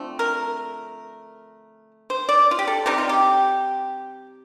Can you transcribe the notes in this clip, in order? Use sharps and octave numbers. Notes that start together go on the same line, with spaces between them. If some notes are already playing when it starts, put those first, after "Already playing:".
Already playing: D3 F3 A3 C4
A#4
C5
D5
F4
G4
A4
C3 G3 C4 D#4 G4
F4
G4